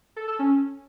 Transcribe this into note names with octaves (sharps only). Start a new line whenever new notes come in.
A4
A4
C#4